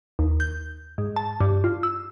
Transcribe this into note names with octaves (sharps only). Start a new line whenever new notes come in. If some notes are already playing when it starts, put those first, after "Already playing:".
D#2
G6
G#2
A5
G2
F4
E6